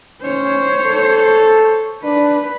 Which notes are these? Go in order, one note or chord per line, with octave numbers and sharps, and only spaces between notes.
C#4 C5 C#5
A4
D4 B4